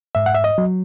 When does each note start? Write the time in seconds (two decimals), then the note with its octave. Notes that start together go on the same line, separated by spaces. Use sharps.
0.15 G#2 E5
0.26 F#5
0.34 E5
0.44 D#5
0.58 F#3